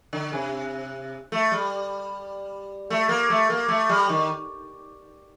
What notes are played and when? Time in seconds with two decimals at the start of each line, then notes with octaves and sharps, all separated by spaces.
0.13 D3
0.33 C3
1.32 A3
1.51 G3
2.90 A3
3.09 A#3
3.30 A3
3.50 A#3
3.68 A3
3.89 G3
4.09 D#3